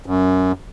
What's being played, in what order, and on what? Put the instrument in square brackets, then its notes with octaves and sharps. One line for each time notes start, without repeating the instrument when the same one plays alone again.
[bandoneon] F#2